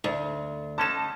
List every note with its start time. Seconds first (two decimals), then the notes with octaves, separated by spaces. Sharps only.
0.04 D2
0.78 D3 C#4 D#4 A5 E7